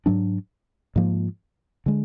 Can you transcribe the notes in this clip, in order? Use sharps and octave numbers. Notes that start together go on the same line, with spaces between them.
G#2 F#3 D4
G#2 F3 A#3
D3 G#3